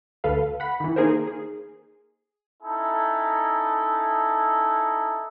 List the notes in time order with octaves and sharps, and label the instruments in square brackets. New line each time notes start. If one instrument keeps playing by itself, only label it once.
[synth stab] D2 A4 B4 F5
F#5 B5
D#3 E3
A#3 D#4 G#4 A#4 C5
G#4
[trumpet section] C#4 D#4 E4 A4